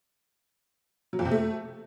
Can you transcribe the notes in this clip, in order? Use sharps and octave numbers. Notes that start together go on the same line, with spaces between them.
F#3
F2
C3
A3